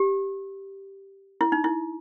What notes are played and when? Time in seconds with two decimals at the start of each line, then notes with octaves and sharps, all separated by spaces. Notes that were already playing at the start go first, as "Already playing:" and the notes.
Already playing: G4
1.41 E4
1.52 D#4
1.64 E4